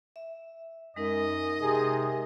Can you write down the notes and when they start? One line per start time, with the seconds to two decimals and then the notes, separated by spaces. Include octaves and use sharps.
0.16 E5
0.96 F#2 G#3 D#4 A#4 D#5
1.61 C3 G#4